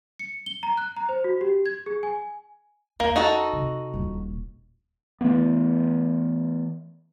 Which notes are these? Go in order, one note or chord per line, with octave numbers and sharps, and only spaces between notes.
C#7
G7
A#5
F#6
A#5
C5
F#4
G4
G#6
G#4
G#5
E2 A#3
D#4 F#4 A4
C3
D#1 A#1
E3 F3 A3 B3